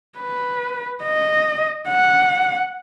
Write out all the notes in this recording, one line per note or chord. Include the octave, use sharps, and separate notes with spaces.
B4
D#5
F#5